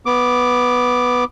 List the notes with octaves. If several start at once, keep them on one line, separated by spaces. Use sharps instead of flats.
B3 D6